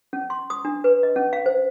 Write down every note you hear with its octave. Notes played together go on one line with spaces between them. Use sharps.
C#4
C6
D#6
D4
B4
D#5
C#4
F5
C5